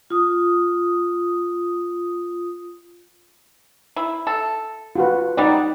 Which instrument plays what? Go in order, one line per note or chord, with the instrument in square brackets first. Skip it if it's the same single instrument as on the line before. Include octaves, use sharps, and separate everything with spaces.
[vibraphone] F4 D#6
[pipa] E4
A4
[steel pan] F4 F#4 B4
[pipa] G3 G4 F#5 [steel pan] D#4 D5